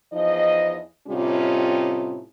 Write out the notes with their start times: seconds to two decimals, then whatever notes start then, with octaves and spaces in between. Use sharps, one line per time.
0.13 E2 F3 D#4 D#5
1.08 A2 C3 G3 C#4 D#4 F4